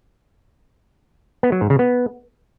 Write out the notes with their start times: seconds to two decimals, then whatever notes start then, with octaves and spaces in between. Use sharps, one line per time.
1.43 B3
1.52 F#3
1.61 G#2
1.70 C#3
1.79 B3